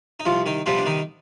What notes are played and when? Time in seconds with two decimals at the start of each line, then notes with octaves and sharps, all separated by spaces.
0.20 D#4
0.25 C2 F3 F4
0.46 D#3 D#4
0.66 C3 F3 G3 B3 F4
0.78 D4
0.86 D#3 D#4